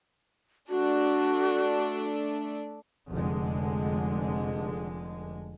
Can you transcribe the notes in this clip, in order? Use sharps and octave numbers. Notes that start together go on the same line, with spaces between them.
A3 D4 F#4
F1 D3 G#3